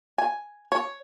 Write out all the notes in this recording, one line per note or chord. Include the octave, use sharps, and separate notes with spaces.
G#5
C#5